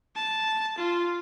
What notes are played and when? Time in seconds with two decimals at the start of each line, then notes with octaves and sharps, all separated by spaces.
0.16 A5
0.78 F4